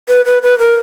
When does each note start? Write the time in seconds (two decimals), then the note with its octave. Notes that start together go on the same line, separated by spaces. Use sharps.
0.08 B4
0.25 B4
0.42 B4
0.59 A#4